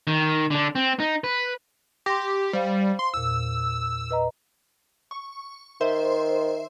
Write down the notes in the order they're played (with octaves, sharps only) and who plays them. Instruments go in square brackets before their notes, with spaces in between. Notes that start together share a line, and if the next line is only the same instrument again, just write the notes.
[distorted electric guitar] D#3
D3 D4
C4
D#4
B4
[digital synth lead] G4 [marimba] C6 A#6
[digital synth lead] G3 [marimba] C5 F5
[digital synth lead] C6
[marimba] E2 A#2 [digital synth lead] E6
[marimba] B4 D#5 A#5
[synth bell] C#6
[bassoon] D#3 [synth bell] C5 E5 C6